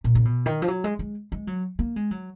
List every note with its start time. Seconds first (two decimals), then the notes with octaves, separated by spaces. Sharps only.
0.04 A#2
0.15 C#3
0.25 B2
0.46 D#3
0.62 F3
0.68 F#3
0.84 G#3
0.99 G#3
1.32 G#3
1.47 F#3
1.79 A#3
1.96 G#3
2.11 F#3